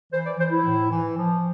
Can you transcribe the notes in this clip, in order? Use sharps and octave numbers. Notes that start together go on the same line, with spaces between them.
E3 C5
D5
E3 C5
E4
A2
E3
F3